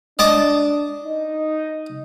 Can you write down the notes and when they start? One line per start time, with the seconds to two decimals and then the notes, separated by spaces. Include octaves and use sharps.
0.19 D4 D#5 A5 D6
1.04 D#4